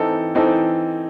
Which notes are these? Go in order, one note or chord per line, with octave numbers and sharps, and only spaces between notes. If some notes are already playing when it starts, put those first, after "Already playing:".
Already playing: E3 C4 D#4 A4
E3 C4 D#4 A4